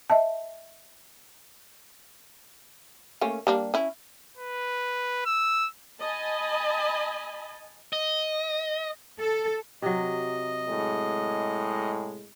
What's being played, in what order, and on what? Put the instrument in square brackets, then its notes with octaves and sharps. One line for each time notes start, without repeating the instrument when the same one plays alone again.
[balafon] D#5 E5 A5
[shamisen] A3 A#3 C#4
G3 A#3 D4
C#4 E4
[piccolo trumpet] B4
E6
[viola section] D#5 G#5 A5 B5
[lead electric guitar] D#5
[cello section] A4
[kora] C3 F#3 [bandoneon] D#5
[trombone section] A2 G#3